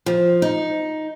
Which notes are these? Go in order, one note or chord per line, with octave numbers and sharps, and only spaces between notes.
F3
D#4